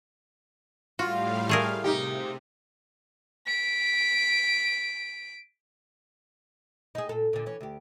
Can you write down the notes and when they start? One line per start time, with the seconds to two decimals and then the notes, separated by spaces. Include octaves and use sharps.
0.99 A2 G3 F4 F#4 F5
1.49 A3 G#4 A#4
1.84 C3 D#4 G4
3.47 B6 D7
6.95 D#4 G#4
7.09 A#2 A4
7.33 A#2 D3
7.46 E3 C#4
7.61 D2 G4